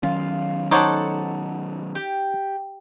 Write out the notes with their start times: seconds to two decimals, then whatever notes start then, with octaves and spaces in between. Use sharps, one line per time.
0.03 D#3 F#3 C#4 F4
0.71 D#4 A4 C5 C#5 F#5 D6
1.95 G4